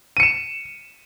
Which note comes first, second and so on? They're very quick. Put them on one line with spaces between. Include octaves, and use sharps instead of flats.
D#7 C#7 E7